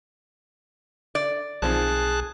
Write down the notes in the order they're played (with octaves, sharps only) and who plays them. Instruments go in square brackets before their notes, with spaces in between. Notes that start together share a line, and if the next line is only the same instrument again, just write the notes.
[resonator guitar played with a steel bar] D5
[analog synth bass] B1 [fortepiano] D#3 F3 C4 [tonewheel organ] G#4 A5 F#6